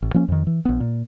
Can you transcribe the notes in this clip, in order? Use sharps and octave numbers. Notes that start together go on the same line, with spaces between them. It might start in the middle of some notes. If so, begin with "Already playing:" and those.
A1
F3 A#3 C#4
F2 D#3
E3
A#1 B3
A#2